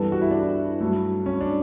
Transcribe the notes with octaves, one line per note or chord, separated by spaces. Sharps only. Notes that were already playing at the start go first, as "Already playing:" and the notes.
Already playing: G2 E3 G3 B3 A4
F#4
E4
D4
E4
G2 F#3 A3
C#4
D4